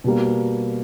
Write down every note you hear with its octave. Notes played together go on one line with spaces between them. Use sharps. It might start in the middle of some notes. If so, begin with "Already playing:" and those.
B2 G3 A#3